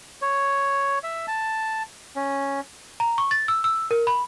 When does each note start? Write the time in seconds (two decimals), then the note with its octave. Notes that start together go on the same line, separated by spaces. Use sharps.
0.22 C#5
1.04 E5
1.28 A5
2.16 C#4
3.00 A#5
3.18 C#6
3.31 A6
3.48 E6
3.64 E6
3.91 A#4
4.07 B5